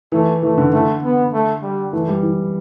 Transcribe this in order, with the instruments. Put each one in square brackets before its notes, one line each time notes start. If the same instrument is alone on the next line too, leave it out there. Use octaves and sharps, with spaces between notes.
[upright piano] E3 [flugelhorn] A3
[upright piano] E3 [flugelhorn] A3
[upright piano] D3
[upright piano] D3 [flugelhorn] A3
[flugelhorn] B3
A3
G3
[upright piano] E3 [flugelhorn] A3
[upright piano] G3
E3